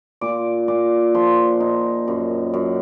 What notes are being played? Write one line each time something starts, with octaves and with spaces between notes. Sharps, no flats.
A#2 D6
A#2 D6
F3 C6
D#4
F#2
F#2